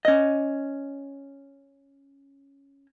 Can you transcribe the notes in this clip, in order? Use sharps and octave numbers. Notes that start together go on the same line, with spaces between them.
C#4 D#5